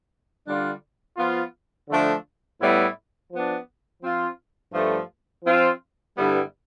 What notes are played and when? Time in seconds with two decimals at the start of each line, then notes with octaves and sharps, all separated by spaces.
0.47 D3 G3 D4 F4
1.17 F3 B3 F4
1.89 D3 F3 A3 D4
2.61 A2 G3 B3 E4
3.31 F3 B3 D4
4.02 F3 C4 F4
4.73 G2 F3 A3
5.44 F3 C4 F4
6.16 G2 D3 G3 B3 E4